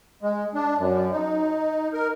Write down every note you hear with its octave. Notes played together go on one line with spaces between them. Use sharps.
G#3
D4
F#2
D#4
A#4